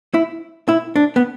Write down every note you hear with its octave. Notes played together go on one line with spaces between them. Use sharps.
E4
E4
D4
B3